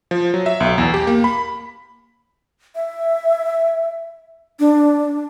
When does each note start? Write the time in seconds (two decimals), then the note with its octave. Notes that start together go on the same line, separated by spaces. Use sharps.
0.11 F3
0.34 F#3
0.46 E5
0.60 B1
0.78 E2
0.94 G4
1.07 A#3
1.24 B5
2.76 E5
4.60 D4